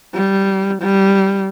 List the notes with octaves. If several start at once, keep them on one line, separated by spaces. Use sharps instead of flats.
G3
G3